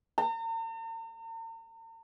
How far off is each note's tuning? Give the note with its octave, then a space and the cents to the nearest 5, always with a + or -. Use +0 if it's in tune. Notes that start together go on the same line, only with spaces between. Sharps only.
A#5 -45